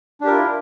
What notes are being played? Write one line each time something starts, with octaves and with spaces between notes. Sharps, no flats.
D4 E4 F4 G4 A#4